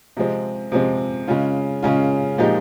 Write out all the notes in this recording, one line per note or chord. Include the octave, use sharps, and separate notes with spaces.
C3 F3 G#3 C4
C3 F3 G#3 C4
C#3 G#3 C#4 F4
C#3 G#3 C#4 F4
A#2 F3 G#3 D#4 G4